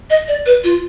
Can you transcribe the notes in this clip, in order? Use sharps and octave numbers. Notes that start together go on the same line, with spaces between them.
D#5
D5
B4
F4